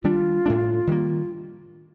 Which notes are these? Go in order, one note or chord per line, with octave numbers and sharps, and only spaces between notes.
D#3 G3 D4 F4
A2 A3 D4
D#3 G3 A#3